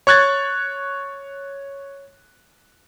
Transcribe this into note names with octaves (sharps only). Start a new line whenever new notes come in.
C#5 C#6 F#6 G#6 A6